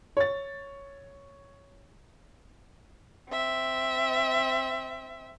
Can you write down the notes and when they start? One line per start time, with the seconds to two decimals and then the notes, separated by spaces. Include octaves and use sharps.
0.17 C#5 A6
3.30 C4 E5